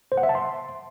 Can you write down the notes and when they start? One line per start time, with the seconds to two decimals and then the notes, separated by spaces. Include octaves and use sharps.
0.12 C5
0.17 F#5
0.23 E5
0.29 A5
0.35 C6